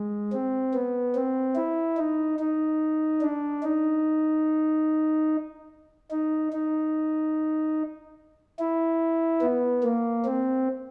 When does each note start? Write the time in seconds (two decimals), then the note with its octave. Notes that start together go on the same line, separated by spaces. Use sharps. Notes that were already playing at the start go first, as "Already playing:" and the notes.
Already playing: G#3
0.33 C4
0.74 B3
1.15 C4
1.56 E4
1.97 D#4
2.39 D#4
3.21 D4
3.63 D#4
6.11 D#4
6.53 D#4
8.59 E4
9.42 B3
9.83 A#3
10.25 C4